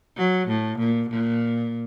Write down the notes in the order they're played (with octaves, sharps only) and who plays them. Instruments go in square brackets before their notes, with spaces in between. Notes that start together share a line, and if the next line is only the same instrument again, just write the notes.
[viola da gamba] F#3
A2
A#2
A#2